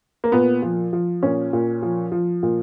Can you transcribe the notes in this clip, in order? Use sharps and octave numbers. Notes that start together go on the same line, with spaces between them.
A#3
A#2 B3
F3
F3
A#2 C#4
A#2
F3
F3
A#2